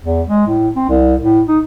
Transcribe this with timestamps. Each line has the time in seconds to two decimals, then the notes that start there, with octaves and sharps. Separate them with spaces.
0.03 E2
0.28 G#3
0.47 A2
0.76 C4
0.88 C2
1.21 A2
1.48 D#4